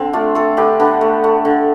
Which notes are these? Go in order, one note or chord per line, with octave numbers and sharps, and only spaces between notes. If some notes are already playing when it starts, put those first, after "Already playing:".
Already playing: D3 C4
A3 D4 F4
A3 F4 A4
D3 G4 B4
D3 B3 D4
A3
A3
D3